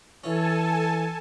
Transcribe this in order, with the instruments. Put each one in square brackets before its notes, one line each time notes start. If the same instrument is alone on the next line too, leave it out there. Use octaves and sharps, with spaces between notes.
[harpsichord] E3 C#4 [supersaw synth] A4 G#5 A5